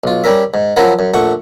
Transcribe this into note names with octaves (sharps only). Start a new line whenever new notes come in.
B1 F4
G3 C#4 A#4 E5
G#2
F3 F#3 C#4 E4 F#4 A#4
F#2
A#1 A3 F#5 C#6